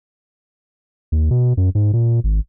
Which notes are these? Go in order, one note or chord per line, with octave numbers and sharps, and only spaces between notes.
D#2
B2
F#2
G#2
A#2
G#1